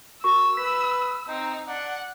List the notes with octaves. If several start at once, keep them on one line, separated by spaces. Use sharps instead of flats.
F#4 A#4 C#6 E6
B4 B6
C4 D#4
D4 F#5